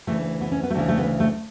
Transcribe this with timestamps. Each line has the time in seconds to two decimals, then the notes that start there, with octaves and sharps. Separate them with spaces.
0.07 D2 C#3 E3 A3
0.41 B3
0.52 C#4
0.63 B3
0.70 A3
0.74 D2 C#3 E3 B3
0.88 A3
0.98 B3
1.20 A3